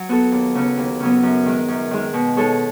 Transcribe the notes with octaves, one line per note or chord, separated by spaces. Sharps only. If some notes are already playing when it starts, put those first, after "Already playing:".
Already playing: F#3
B3 F#4 A4
D#2
C#3 F#3 B3
D#2
C#3 F#3 B3
F#2
D#3 G#3
F#2
D#3 G#3
B2
G#3 D#4 A4 C#5